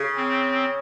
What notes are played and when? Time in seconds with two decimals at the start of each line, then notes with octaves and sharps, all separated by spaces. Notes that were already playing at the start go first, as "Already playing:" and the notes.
Already playing: C#3
0.17 C4